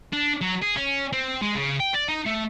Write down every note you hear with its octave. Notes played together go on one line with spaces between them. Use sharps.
D4
F#3
G#4
C#4
C4
G#3
C#3
G5
D5
D#4
A3